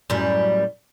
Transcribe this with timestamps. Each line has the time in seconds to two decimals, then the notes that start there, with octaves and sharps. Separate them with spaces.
0.10 F#2 A2 G3